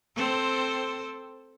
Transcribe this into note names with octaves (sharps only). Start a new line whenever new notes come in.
C4 A4 C5